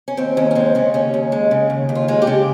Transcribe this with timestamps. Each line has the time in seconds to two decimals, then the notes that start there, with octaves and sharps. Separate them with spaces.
0.08 C#4
0.17 D#2 C4
0.37 D#2 C#4
0.51 C#4
0.55 G#3 C4
0.75 C#3 C#4
0.94 D#2 C#4
1.14 D#2
1.32 G#3
1.51 C#3
1.70 D#2
1.89 D#2
1.95 F4
2.08 G#3 F4
2.22 G4
2.27 C#3